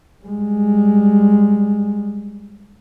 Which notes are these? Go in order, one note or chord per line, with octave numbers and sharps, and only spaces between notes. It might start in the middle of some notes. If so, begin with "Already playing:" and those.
G3 G#3